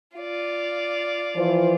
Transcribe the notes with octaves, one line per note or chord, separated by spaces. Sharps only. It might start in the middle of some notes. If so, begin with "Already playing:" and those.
F4 D5
E3 F3 C5